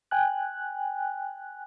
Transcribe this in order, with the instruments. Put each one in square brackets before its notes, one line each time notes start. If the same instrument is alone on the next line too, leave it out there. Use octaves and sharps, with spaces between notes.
[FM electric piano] G5 G#5 F#6